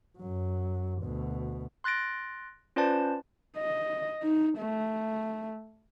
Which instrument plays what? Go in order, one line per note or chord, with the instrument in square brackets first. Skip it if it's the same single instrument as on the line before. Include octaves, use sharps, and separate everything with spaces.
[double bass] F#2 F#3
D2 B2
[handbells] C6 F#6 A6 A#6 D7
C#4 F4 B4 C5 D5 A5
[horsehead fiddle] D#5
D#4
A3